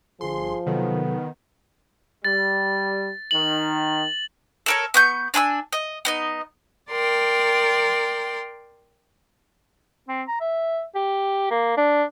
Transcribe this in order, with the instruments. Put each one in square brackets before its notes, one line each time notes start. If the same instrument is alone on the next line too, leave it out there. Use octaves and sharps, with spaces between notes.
[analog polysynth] G1 C6 [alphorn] F3 [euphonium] G#4
[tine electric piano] C3 F#3 A4 [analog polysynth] D#3 [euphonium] B3
[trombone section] G3 [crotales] A6
[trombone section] D#3 [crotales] F#7
[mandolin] A4 A#4 C#5
B3 C#6 G6
D4 G#5 B5 E6
D#5
B3 D#4 D#5
[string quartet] A#4 D5 G5 C6
[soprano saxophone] C4
A#5
E5
G4
A#3
D4